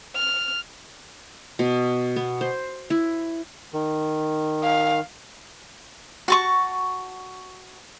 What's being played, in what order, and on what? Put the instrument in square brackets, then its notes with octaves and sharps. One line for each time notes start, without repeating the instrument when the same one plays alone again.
[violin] F6
[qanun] B2
B3
C5
E4
[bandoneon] D#3
[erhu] F5
[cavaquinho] F#4 A5 C#6